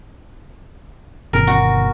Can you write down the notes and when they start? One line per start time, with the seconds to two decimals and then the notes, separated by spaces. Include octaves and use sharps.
1.33 G1 B2 D#3 A#4
1.47 F#4